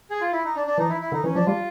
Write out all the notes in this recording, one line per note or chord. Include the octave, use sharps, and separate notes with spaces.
G#4
F4
E4
D#4
D4
D4
E3 D#4
E4
E4
D3 D#4
E3 C#4
F3 D4
G3 F4